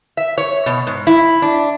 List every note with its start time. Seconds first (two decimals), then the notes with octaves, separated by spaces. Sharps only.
0.17 E5
0.38 C#5
0.66 B2
0.87 G#2
1.07 E4
1.42 D4